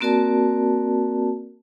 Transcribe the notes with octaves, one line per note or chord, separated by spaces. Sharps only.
A#3 C4 F#4 A#4 D5 A5